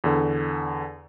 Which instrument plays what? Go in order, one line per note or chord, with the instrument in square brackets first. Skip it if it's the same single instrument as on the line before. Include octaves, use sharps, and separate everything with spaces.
[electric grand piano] E2 D3